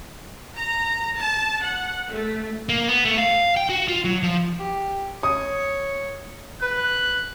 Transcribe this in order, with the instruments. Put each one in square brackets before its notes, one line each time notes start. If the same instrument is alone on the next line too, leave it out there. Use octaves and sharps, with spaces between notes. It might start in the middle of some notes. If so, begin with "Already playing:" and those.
[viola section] A#5
A5
F#5
A3
[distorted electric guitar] A#3
B3
A3
F5
G5
F#4
F4
F#3
F3
[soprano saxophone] G4
[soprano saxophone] C#5 [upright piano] D#6
[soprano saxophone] B4 [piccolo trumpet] F#6